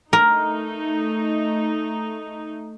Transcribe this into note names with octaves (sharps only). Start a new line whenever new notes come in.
A3 D#4 A#4